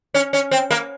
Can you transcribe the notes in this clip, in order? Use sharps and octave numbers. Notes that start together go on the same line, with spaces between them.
C#4
C#4
C4
A#3